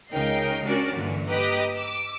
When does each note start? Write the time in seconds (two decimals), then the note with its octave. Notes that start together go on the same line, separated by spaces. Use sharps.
0.12 C#2 C#3 D#4 A#4 G5 C7
0.64 C#4 D4 F#4 A#4 D5
0.95 G2 A#2 D3 E3
1.27 G4 B4 D#5 A#5
1.76 D6 E6